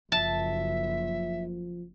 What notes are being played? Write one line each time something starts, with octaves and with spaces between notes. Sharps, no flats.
F#1 F3 E5 A5